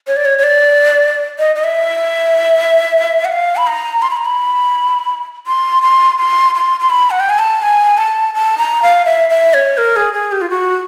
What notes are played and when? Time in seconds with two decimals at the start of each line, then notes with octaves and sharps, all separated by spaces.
0.07 C#5
0.17 D5
0.25 C#5
0.38 C#5
0.43 D5
1.39 D#5
1.56 D#5
1.64 E5
3.25 F#5
3.32 F5
3.57 B5
3.67 A#5
4.02 C6
4.11 B5
4.17 A#5
4.25 B5
5.47 C6
5.83 C6
6.18 C6
6.55 C6
6.80 C6
6.90 B5
7.11 F#5
7.20 G5
7.30 G#5
7.39 A5
7.62 G#5
7.98 A5
8.34 A5
8.58 A#5
8.82 F5
9.05 E5
9.30 E5
9.54 C#5
9.78 A#4
9.96 G#4
10.13 G#4
10.32 G4
10.41 F4
10.50 F#4